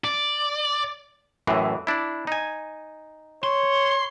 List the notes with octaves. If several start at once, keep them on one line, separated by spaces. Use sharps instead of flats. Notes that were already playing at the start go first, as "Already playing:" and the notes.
D5
F#2 A2 E3
D4 E4
D#4 G#5
C#5 C6